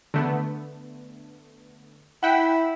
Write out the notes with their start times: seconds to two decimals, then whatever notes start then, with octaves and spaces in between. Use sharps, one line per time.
0.14 D3 A3 B3
2.23 E4 F#5 G5 B6